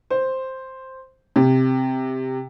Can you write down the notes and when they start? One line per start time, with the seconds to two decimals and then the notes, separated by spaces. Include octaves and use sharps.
0.10 C5
1.36 C3